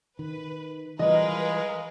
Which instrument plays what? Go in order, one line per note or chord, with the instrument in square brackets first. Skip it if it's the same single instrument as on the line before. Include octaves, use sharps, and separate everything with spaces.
[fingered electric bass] D#3 [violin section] B4
[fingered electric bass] E3 F3 G3 [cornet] G#3 [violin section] A#4 B4 F5 [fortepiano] D#5